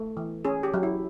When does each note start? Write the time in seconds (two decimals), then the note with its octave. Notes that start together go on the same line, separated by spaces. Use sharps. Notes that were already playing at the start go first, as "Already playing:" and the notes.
Already playing: A3
0.17 E3
0.45 C#4 G#4
0.63 G4
0.74 F#3
0.83 E4